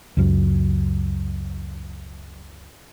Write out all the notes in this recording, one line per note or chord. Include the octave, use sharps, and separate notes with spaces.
C#2 F#2